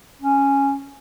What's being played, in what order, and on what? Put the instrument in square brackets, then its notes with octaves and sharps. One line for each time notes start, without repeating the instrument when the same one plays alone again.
[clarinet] C#4